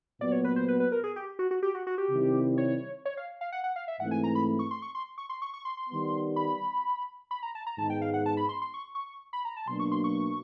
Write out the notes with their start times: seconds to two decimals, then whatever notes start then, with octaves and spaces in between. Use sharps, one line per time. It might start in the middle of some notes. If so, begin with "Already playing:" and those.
0.21 A#2 F#3 B3 D5
0.32 C#5
0.44 B4
0.56 C5
0.68 B4
0.80 B4
0.92 A#4
1.04 G#4
1.16 G4
1.39 F#4
1.51 F#4
1.63 G4
1.75 F#4
1.87 F#4
1.98 G4
2.10 C3 D#3 G3 C4 E4
2.58 C#5
3.05 C#5
3.17 F5
3.41 F5
3.52 F#5
3.64 F#5
3.76 F5
3.88 E5
4.00 G#2 E3 A3 C4 F#5
4.11 G#5
4.24 A#5
4.35 B5
4.59 C#6
4.71 C6
4.82 C#6
4.95 C6
5.18 C#6
5.29 C6
5.42 C#6
5.54 C#6
5.65 C6
5.77 C6
5.90 D#3 G3 B3
6.36 B5
7.31 B5
7.43 A#5
7.55 A5
7.67 A#5
7.78 G#2 D#3 G#3 B3 D#4 A5
7.90 G5
8.02 F5
8.14 F#5
8.26 A5
8.37 B5
8.49 C6
8.62 C6
8.74 C#6
8.95 C#6
9.33 B5
9.45 A#5
9.57 A5
9.68 B2 F#3 A#3 D4 C6
9.80 C#6
9.92 C6
10.04 C#6